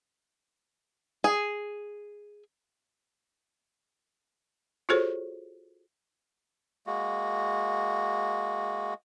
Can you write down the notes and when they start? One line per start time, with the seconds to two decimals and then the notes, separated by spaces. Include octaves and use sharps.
1.24 G#4
4.89 F4 F#4 G#4 A4 C5 C#5
6.87 G#3 A#3 F#4